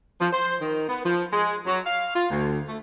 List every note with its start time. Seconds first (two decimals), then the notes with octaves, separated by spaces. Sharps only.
0.21 F3
0.33 C5
0.61 D#3
0.89 B3
1.05 F3
1.33 G#3
1.66 F#3
1.86 F5
2.15 F4
2.30 D2
2.67 A3